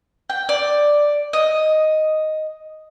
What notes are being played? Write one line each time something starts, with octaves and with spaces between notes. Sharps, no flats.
G5
D5
D#5